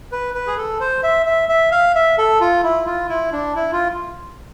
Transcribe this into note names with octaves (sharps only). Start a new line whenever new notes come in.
B4
B4
G#4
A4
C5
E5
E5
E5
F5
E5
A4
F4
E4
F4
E4
D4
E4
F4